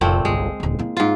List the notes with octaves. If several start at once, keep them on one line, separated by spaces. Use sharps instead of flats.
F1 A#2 A3 C4
G1 C2 G#3
D#1 D2
A#3 E4
G#2 F4